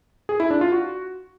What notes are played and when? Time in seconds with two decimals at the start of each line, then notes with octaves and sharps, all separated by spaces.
0.29 G#4
0.40 E4
0.50 D4
0.61 F4
0.72 F#4